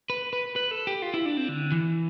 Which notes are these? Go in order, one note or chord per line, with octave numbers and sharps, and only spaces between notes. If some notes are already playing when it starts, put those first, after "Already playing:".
B4
B4
B4
A4
G4
F4
E4
D4
C4
D3
E3